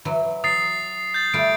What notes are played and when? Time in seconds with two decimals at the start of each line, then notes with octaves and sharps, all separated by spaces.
0.05 E3 F#3
0.44 F#3 D#6 A6 C7
1.14 G6 A6
1.34 G3 A3 F4 D7